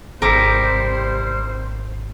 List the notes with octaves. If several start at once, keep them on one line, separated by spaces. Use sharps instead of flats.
G#1 C3 G3 E4 A#4 C5 D6